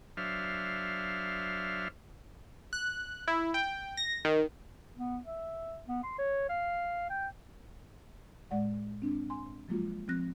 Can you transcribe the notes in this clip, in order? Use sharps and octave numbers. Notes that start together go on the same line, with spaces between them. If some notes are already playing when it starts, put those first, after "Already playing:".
F#3 D4 C5 E5 F5 F6
F#6
E4
G5
A#6
D#3
B3
E5
B3
C6
C#5
F5
G5
A2 G#3 D5 F#5
C4 D4
G#5 C6
F3 F#3 G#3 A#3 F4 F#4
F3 C4 F#6 A#6